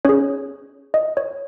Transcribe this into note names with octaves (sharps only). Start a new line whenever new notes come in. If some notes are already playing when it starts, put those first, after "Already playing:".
C#4 G#4 C#5
D#5
C#5